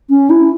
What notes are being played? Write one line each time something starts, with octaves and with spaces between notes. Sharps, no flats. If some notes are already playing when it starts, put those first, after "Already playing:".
C#4
E4